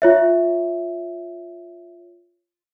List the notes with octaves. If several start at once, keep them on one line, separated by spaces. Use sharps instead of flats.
F4 C#5 E5